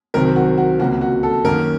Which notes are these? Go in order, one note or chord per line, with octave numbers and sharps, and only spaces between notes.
C2 C3 D#3 F#3 C4 A#4
F#4
F#4
C#2 C3 F3 A#3 C#4 F#4
F#4
A4
F#2 D#3 A#3 C#4 A#4